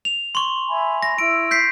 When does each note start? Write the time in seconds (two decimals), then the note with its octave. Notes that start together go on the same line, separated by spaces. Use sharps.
0.05 F7
0.35 C6 C#6
0.68 E5 G#5 B5
1.02 A#6
1.18 E4 E6 D7
1.51 G6 B6 C7